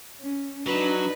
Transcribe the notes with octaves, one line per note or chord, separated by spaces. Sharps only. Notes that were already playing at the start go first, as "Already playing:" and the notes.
C#4
F#3 D4 D#4 B4